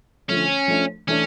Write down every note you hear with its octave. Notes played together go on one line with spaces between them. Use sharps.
D3 F3 A3 C#4
F3 A3 D4
E3 A3 C#4 D4